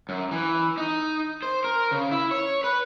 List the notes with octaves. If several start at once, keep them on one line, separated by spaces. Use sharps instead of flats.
F#2
E3
D#4
C5
A#4
C#3
E4
C#5
B4